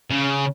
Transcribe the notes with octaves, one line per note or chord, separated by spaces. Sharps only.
C#3